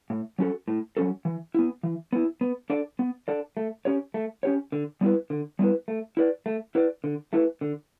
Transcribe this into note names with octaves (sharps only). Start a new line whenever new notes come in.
A2
F#3 C#4 F#4 A4
A2
F#3 C#4 F#4 A4
E3
B3 E4
E3
B3 E4
B3
D4 A4 D5
B3
D4 A4 D5
A3
C#4 G4 C#5
A3
C#4 G4 C#5
D3
G3 B3 E4 B4
D3
G3 B3 E4 B4
A3
E4 B4 D5
A3
E4 B4 D5
D3
A3 E4 B4
D3